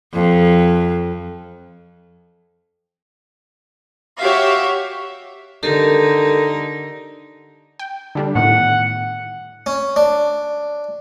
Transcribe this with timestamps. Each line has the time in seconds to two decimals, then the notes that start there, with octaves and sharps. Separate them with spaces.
0.13 F2
4.21 F#4 G4 C#5 E5 F5
5.63 D3 D#4 G4 A4 A#4
7.79 G5
8.15 D3 G3 D4
8.35 A2 D#3 B3 F#5
9.66 C#4
9.96 D4